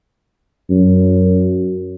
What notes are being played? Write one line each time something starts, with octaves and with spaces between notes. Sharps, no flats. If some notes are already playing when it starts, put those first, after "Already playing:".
F#2